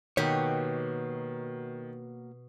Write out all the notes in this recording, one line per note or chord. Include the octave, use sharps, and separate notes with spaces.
B2 D#3 A#3 F#4 G4 C#5